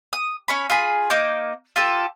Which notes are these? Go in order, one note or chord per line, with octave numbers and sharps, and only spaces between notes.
D#6
C#4 C#5 B5
F4 G#4 B5
A#3 D#4 D6 G6
F4 G4 A4